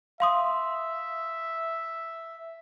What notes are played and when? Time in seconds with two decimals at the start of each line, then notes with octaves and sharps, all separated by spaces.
0.20 E5 F5 C6 D#6